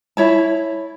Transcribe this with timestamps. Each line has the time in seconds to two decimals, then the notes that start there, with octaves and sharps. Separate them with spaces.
0.17 E4 C#5 A5